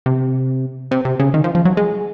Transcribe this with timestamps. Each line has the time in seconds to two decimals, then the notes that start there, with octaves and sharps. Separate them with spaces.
0.06 C3
0.91 C3
1.05 C3
1.20 C#3
1.34 D#3
1.44 F3
1.55 F3
1.65 F#3
1.77 G#3